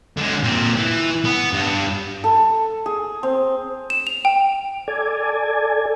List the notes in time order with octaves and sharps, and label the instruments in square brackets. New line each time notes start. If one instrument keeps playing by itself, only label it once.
[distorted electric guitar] D3 G#3
A#2 C4
E3
B3
G2
[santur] A4
G#4
C4
[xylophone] E7
F7
G5
[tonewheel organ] A4 D5 G#5